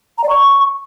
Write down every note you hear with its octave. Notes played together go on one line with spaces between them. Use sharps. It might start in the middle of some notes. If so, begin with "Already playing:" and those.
A#5
D5
C#6